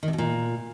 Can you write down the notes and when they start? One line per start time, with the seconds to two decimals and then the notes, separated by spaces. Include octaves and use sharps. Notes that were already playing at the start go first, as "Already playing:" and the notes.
0.03 D#3
0.08 C3
0.13 B2
0.18 A#2